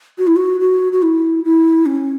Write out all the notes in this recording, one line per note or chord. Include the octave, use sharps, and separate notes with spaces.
F#4
E4
F#4
F#4
F#4
E4
E4
C#4